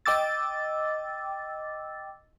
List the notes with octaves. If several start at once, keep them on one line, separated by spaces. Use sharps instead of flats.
D#5 G5 D6 E6 A6